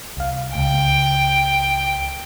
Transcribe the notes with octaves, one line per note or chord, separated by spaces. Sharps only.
C2 F5
C#2 G5